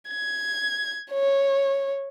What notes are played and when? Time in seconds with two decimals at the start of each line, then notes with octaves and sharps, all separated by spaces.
0.10 G#6
1.11 C#5